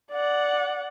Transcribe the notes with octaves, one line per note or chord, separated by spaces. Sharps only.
D5 F#5